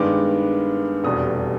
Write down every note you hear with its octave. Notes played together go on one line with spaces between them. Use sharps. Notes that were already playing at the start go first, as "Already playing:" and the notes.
Already playing: G2 D#3 G#3 B3 D6
F1 E2 B2 G3 D#6